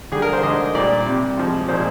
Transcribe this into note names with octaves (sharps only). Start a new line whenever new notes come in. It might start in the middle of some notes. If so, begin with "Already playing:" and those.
D3 G3 G#4
A#4
C5
D3 G#3 D#5
A#2 G3 D5
C3 G3
C3 F3 G#3
A#2 F3 G#3 C5